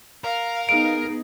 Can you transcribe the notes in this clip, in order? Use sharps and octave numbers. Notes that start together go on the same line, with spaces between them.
A#4 F5
B3 D#4 G#4 D7